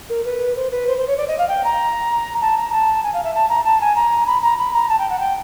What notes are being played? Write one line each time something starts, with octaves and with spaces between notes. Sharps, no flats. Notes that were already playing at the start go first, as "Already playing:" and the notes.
A#4
B4
C5
B4
C5
C5
C#5
D5
D#5
F5
G5
A#5
A5
A#5
A5
G#5
F5
E5
A5
A#5
A5
G#5
A#5
B5
A#5
B5
A#5
A5
G5
F#5
G5